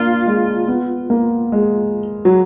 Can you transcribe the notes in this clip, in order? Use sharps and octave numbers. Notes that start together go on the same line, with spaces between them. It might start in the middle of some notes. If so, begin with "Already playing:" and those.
Already playing: A#3 D4 F4
G#3
B3
A#3
G#3
F#3